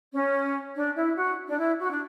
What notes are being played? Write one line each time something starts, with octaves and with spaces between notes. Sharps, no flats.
C#4
D4
E4
F#4
D4
E4
F#4
D4